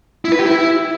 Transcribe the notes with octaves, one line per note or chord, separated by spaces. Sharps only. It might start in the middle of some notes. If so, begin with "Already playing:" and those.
E4
B4
G4
E4